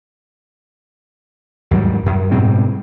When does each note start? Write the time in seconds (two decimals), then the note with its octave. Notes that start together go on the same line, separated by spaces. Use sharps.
1.71 D#2 G#2 F#3 G3
2.06 F#2
2.31 G#2 B2 G3 C4